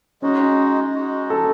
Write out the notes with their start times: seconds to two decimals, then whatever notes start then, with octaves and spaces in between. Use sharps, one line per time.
0.22 G#3 C#4 D#4 F#4
0.94 G#3 D#4 F#4
1.30 A4